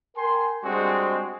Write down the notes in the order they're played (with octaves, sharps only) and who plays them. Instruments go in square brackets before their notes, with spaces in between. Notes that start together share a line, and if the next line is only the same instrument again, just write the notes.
[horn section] A#4 G5 G#5 C6
G3 G#3 C4 D4 F#4 G#4